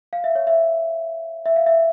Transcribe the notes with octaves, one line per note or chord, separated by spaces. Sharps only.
F5
E5
C#5
E5
E5
F5
E5